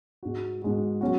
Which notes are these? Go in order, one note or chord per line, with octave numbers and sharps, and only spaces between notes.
G#2 G#3 F#4
G#2 G#3 F#4
F#3 C#4 F#4